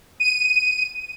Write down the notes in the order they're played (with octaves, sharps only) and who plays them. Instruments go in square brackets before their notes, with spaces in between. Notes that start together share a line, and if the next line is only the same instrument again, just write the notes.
[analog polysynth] D#7